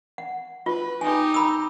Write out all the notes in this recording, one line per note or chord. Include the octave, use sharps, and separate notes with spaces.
F#5
F4 B4
D#4 G4 G#5
A#5 B5 E6